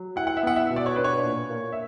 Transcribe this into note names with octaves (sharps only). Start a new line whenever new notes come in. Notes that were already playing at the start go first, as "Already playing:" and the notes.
Already playing: F#3
E4 F#5
F#5
E5
B3 F#5
E5
B2
D5
C#5
D4 B4
C#5
A#2
A#3
E5